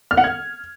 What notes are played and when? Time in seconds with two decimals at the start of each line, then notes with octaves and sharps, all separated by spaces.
0.11 F6
0.17 F#5
0.24 G#6